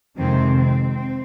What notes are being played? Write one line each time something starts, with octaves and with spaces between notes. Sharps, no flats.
F2 C3 D#3 G#3 C4
C4
C4